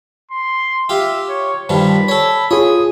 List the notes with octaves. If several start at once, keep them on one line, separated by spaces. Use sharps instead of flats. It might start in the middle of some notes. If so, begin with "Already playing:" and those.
C6
F4 G4 E5
C#5
G2 D#3 F3 B5
A4 C#5
F4 G#4 C#5 D#6